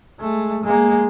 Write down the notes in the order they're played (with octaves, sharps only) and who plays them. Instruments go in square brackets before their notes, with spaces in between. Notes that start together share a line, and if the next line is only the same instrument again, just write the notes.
[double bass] G#3 A3
G#3 A#3